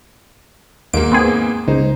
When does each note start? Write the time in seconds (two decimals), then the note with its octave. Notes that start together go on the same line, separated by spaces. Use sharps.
0.94 D#2 G#2 A#3 D7
1.12 B3 C4 G#4
1.68 C#2 D#4 C5